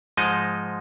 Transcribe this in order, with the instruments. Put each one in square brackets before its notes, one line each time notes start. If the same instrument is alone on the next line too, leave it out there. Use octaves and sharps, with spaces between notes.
[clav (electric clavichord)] G#2 F3 G#3 D#4 D#5